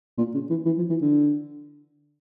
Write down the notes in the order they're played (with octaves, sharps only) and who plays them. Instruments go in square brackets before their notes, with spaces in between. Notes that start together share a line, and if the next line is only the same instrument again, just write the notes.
[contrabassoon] A#2
C#3
E3
E3
F3
E3
D3